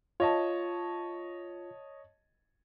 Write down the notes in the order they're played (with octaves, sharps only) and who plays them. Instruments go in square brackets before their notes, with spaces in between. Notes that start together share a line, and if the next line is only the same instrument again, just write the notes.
[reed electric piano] F4 [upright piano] C#5 D#5 A5